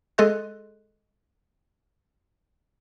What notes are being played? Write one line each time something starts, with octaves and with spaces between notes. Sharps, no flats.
G#3 G#4 A4 D#5 C6 F#6